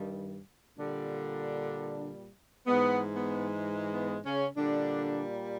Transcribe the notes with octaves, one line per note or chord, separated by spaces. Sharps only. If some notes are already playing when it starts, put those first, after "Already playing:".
Already playing: G2 D#3 G3
A#2 D3 G3 D4
G#2 E3 G#3 B3
B3
B3
C#3 C#4
A#2 D3 G3 D4